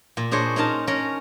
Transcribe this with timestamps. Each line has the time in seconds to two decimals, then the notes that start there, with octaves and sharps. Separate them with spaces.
0.17 A#2
0.31 D4 G#4 C5 C#5 D#5
0.56 C#4 D#4 A#4 A5
0.87 C#4 A#4